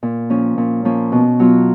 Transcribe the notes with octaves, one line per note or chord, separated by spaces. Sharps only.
A#2
F3 A#3 C#4
A#2
F3 A#3 C#4
B2
F#3 B3 F4